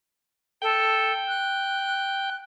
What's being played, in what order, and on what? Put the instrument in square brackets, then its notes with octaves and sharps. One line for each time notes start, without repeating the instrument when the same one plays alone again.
[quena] A4 [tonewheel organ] G5
[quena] F#6